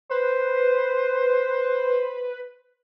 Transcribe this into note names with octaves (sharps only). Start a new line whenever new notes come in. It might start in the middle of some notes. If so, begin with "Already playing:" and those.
B4 C5